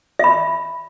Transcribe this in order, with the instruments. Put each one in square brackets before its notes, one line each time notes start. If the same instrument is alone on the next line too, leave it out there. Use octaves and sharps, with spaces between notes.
[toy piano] E5 B5